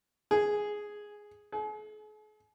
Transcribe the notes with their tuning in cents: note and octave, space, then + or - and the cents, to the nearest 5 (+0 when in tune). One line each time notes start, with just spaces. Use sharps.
G#4 +0
G#4 +45